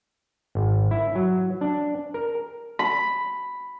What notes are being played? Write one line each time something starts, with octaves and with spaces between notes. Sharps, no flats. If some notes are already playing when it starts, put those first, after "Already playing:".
G#1
E4
F#3
D4
A#4
B5